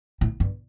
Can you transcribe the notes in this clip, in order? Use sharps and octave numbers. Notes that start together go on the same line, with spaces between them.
A2
G2